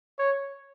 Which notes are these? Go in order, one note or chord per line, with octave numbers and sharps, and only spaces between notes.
C#5